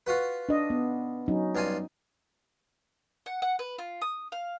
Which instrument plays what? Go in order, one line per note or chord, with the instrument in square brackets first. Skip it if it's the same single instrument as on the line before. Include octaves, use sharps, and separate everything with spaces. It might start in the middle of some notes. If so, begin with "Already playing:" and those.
[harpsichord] F4 F#4 B4
[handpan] D4 D#5
B3
F#3 C#4 D#4
[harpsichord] G2 F4 G#5
[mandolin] F#5
F#5
B4
F4
D#6
F5